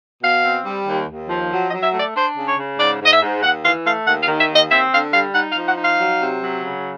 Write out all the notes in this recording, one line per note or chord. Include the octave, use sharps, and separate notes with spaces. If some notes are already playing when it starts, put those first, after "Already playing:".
B2 F5
C4
G3
D#2
D#2
F3
F#3
D#5
F#3
E5
A3 D5
D4 C5
C#3
C#5
C#3
G#2 D5
G#2 D#5
E5
G#2
D#2 F#5
E3 F5
A3 F5
D#2 F#5
F5
D#3
E5
D#2
D#5
C4 E5
D3 F5
G3 F5
D#4 F#5
F5
F3
F#5
D#4
F5
F#3
C3
F#3
C#3